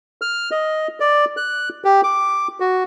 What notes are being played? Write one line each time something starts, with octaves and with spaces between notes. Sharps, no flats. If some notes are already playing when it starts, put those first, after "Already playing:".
F6
D#5
D5
F#6
G4
D6
F#4